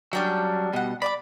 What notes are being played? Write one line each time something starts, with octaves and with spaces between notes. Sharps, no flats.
F#3 G3 C#4 D4 G5
B2 G3 D#5 F#5
D5 E5 B5 D6